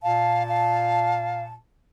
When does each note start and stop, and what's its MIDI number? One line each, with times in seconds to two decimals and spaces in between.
0.03 1.55 46
0.03 0.43 77
0.03 1.55 81
0.49 1.43 77